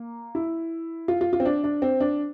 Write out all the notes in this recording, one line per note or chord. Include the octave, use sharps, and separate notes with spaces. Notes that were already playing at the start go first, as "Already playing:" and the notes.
Already playing: A#3
E4
F4
F4
F4
C4
D4
D4
C4
D4